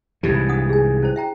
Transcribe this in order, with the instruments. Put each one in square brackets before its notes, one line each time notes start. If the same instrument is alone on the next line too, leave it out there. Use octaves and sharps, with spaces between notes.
[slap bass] C2 G#2 E3 [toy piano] G4
[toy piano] B5
D4 F#5 D#6
G#4 G#5
C#4 E4 C5
E5 G5 A#5